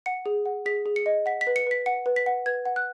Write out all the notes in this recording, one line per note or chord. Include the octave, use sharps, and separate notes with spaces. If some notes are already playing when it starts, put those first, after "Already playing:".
F#5 C#7
G#4
F#5
G#4 B6
G#4
C#7
D#5
F#5 B6
B6
B4
C#7
B4 B6
F#5 C#7
B4
B6
F#5
B4 G#6
F#5
F#6